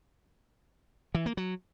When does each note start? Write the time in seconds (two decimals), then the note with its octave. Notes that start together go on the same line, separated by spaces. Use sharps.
1.15 E3
1.26 A#3
1.37 F#3